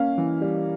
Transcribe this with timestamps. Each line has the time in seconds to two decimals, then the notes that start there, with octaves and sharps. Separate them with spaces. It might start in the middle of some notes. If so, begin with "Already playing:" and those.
Already playing: A#3 C#4 F5
0.18 E3
0.41 G3